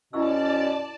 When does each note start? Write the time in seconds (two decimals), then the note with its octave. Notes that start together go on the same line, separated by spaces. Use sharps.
0.13 F#2 B2 C#4 E4 D5 A5 C#6 E6